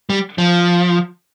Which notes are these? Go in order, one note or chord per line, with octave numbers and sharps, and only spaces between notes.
G3
F3